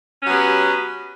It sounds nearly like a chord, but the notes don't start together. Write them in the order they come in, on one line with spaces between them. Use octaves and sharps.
C#4 F#3 B3 G4